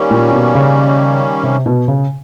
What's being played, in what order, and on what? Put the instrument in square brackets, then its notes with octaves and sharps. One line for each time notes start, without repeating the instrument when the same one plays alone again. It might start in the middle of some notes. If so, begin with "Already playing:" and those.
Already playing: [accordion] D#3 G3 A#3 C#4
[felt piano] A#2
B2
C#3
C3
B2
C#3